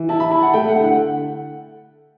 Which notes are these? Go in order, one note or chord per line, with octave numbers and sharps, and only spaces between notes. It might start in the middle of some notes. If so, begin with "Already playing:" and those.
Already playing: E3
E4 A5
B5
E4 A5
F#5
A3 G5
F#5
D3
F#5